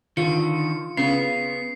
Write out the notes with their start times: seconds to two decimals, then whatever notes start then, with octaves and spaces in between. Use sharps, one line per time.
0.17 D3 D#3 F4 C#7
0.97 C#3 B3 C7